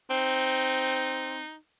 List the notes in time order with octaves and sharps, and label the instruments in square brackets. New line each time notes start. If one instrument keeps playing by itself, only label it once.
[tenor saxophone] C4 [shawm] D#4